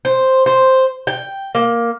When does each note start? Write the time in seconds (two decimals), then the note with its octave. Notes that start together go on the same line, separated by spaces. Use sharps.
0.05 C5
0.46 C5
1.07 G5
1.55 A#3